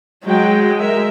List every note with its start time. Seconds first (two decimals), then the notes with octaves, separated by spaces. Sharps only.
0.25 F#3 G#3 G5
0.78 A#4 E5